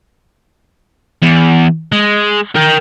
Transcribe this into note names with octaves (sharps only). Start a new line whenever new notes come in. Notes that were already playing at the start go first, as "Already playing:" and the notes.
E2
G#3
A#4 G5